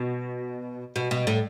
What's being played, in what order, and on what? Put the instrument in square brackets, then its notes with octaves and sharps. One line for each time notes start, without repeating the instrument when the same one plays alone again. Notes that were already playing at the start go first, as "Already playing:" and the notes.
Already playing: [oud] B2
B2
B2
A2